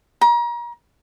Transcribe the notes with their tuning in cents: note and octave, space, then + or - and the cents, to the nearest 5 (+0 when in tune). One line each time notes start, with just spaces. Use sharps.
A#5 +35